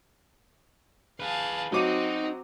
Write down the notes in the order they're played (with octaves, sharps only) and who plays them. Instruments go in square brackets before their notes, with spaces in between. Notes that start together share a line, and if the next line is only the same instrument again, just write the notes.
[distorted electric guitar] G#4 B4 [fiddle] F5 A5
[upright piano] F#3 D6 D#7 [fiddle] C4 F#4 [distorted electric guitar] D#4